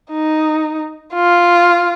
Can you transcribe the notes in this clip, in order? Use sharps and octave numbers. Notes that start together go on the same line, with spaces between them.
D#4
F4